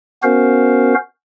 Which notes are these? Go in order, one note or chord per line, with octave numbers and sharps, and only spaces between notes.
B3 C#4 F#4 A#4 C5 F5